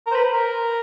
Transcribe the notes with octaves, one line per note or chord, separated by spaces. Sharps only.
A#4
C5
B4
A#4